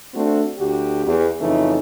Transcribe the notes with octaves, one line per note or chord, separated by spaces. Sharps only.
A3 C4 D4 F#4
D2 F#4 G4
E2
F2 C#3 E3 A3 D#4